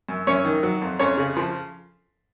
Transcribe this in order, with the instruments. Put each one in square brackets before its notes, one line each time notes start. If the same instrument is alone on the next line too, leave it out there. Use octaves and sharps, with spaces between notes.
[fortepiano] F#2
F#2 C#4 C#5
D#3
F#3
F2
F2 C#4 C#5
C#3
F3